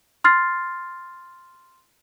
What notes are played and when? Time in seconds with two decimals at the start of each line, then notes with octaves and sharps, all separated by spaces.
0.24 C6 F6 A6 C7